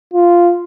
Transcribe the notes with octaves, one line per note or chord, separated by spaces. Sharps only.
F4